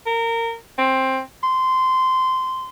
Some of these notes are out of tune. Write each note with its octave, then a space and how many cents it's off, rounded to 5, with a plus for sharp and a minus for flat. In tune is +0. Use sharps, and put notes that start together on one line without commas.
A#4 -20
C4 +15
C6 -15